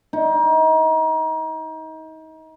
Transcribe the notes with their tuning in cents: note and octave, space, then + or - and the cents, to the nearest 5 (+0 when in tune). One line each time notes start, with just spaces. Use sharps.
D#4 +30